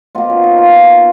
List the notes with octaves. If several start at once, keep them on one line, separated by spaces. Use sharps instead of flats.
B2 A#3 F4
C#4
D#4
F4